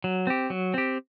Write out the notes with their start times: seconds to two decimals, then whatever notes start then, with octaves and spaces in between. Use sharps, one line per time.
0.04 F#3
0.27 C4 G4
0.50 F#3
0.74 C4 G4